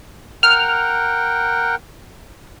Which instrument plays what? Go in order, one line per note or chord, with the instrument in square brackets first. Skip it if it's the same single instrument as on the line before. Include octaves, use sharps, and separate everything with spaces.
[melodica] A#4 F#5 G5 [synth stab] F6